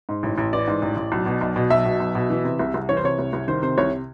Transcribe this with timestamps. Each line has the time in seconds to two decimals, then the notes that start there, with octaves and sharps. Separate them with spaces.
0.09 G#2
0.23 A1
0.38 A1
0.53 E3 D5
0.67 G#2
0.82 A1
0.97 A1
1.12 B1
1.26 B2
1.41 B1
1.56 B2
1.70 B1 E5
1.86 B2
2.00 B1
2.15 B2
2.30 E3
2.44 C3
2.59 C2
2.74 C2
2.89 E3 C#5
2.97 C5
3.04 C3 C#5
3.19 C2
3.33 C2
3.48 D#3 C5
3.62 C3 C5
3.78 C2 C#5